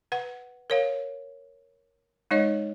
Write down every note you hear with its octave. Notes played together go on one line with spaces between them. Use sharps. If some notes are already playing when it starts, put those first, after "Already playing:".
B4 F#5
A#4 C#5 F5
G#3 D#4 C#5 D#5